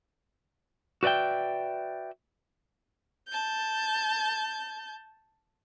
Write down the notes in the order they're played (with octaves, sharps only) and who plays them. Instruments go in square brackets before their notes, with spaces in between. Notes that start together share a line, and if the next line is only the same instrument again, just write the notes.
[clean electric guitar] F#4 B4 D5 E5 G5
[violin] A5 G6